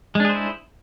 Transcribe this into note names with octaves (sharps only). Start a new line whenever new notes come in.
G#3 D4 E4 G#4 C5